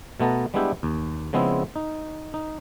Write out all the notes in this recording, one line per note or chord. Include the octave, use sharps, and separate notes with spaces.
B2 A3 B3 A5 A#5
G3 G#3 B3 D4 E4 G4
D#2
C#3 F3 G#3 B3 C4 E4
D#4
D#4